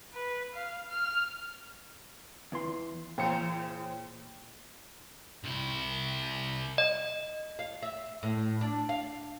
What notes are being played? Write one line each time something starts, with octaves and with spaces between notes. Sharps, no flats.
B4
F5
F6
E2 E3 C6
A#2 C#3 E3 C5 G5 C#7
C2 E4
D#5
F5
E5
A2
D4
F5